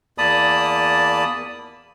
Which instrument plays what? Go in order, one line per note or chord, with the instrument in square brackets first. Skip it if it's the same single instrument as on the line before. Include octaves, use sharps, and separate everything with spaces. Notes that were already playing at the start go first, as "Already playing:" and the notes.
[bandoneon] E2 A#3 D5 A5 B5 D#6